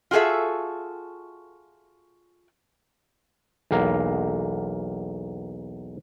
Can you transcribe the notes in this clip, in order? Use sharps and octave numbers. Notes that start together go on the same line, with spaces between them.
F4 F#4 G#4 A4 E5
B1 E2 A#3